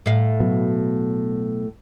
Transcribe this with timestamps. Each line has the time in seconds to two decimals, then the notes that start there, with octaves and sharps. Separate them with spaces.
0.06 A2 F5
0.40 B2 F#3 B3